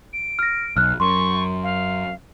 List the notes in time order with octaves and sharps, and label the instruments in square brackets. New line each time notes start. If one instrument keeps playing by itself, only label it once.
[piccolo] D7
[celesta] F6 A#6
[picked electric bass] B1 [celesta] F6 F#6
[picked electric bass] F#2 [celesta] C6 [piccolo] C#6
[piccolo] F5